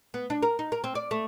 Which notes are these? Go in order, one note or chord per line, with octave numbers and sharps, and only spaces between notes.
B3
D4
A#4
D#4
A#4
C4
D5
A3